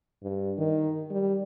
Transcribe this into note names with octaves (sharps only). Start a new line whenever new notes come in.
G2
D#3
G3